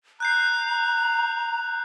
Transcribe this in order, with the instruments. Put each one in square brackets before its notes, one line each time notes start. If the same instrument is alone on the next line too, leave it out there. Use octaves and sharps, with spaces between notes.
[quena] A#5 [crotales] F#6 G6 C7